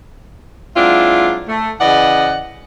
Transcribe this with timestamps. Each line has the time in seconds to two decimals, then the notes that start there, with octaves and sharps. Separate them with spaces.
0.77 F#3 G#3 C4 D4 E4 F4
1.49 A3
1.81 C#3 E3 D5 D#5 F#5